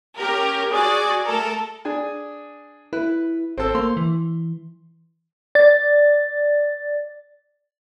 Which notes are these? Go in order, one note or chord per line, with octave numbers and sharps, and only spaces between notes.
C#4 G4 A#4
F#4 G#4 D5 G#5
A3 A4 A#4
D4 G#4 G#5
E4 B4
G#1 C4 A4
A#3 C6
E3
D5 A6